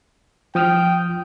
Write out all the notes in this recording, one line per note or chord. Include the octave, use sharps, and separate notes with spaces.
F3 G5 D#6 F6